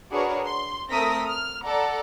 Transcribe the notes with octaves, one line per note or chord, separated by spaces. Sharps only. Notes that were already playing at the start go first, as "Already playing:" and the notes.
D4 F#4 G#4 A#4 B4 C#5
C6
A3 C4 A#4 D#6 A#6 B6
F6
A4 D5 F#5 A5 A#5